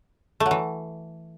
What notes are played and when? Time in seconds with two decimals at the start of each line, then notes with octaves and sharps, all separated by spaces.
0.40 A3
0.46 F#3
0.51 E3